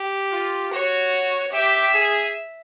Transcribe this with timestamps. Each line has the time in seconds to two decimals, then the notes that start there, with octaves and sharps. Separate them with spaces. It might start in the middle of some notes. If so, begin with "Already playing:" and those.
Already playing: G4
0.32 F4
0.72 F#4 C#5
1.53 G4 E5
1.93 G#4